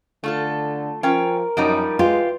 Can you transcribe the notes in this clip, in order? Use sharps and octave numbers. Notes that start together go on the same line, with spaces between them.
D3 A3 F4 A4
F3 C#4 F4 A#4 G5
F#2 F3 G3 D#4
E3 G#3 F4 G4